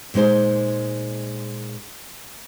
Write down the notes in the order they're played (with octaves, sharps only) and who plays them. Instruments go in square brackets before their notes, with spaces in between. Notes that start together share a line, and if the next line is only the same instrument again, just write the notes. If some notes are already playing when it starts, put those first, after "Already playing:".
[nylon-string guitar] A#2 G#3 D#4 C5